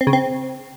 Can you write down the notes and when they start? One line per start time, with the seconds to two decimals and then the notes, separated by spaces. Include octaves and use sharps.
0.01 C4
0.07 C#3
0.13 C4